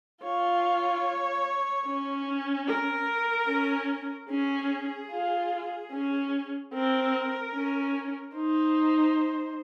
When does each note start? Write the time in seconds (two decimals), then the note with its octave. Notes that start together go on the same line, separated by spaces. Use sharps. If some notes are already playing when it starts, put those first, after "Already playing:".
0.23 F4 C#5
1.86 C#4
2.67 A#4
3.49 C#4
4.29 C#4 G#4
5.11 F4
5.92 C#4
6.74 C4 A#4
7.54 C#4
8.36 D#4 C5